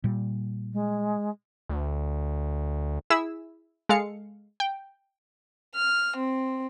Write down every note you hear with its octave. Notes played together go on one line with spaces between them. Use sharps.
A#2 G3
G#3
D2
E4 G#4 E6
G#3 A4 F5 C#7
G5
F6
C4